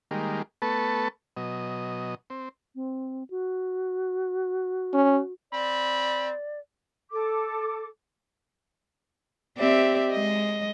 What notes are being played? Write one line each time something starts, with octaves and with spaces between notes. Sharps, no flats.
D#3 G3 G#3 A#3
A3 B3 A4 B4 A5 C#6
B2 F#3 D#5
C4
C4
F#4
C#4
C4 D5 B5
A4 D6
C4 G4 D5 E5
G#3 D#5